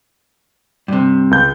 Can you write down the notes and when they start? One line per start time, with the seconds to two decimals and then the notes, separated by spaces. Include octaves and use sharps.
0.88 G2 C3
1.31 C#2 G6